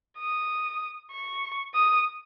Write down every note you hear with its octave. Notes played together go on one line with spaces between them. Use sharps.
D#6
C#6
D#6